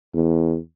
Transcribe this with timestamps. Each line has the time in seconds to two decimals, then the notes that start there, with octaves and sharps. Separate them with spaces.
0.14 E2